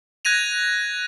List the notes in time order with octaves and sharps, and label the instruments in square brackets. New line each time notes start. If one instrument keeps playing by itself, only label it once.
[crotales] F#6 G#6 A#6 D#7 F7